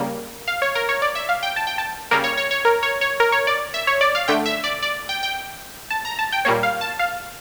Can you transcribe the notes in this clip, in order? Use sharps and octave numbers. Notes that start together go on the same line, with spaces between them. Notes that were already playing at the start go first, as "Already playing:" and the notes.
Already playing: C#3 G3 A#3
F5
C#5
A#4
C#5
D5
E5
F5
G5
A5
G5
A5
C#3 G3 A#3 A#4
C#5
C#5
C#5
A#4
C#5
C#5
A#4
C#5
D5
E5
C#5
D5
F5
D3 A3 G5
E5
D5
D5
G5
G5
A5
A#5
A5
G5
A#2 G3 A#3 C#5
F5
A5
F5